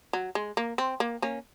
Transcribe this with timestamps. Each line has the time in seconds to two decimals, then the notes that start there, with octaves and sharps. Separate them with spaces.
0.13 F#3
0.35 G#3
0.57 A#3
0.78 C4
1.00 A#3
1.22 A#3 C#4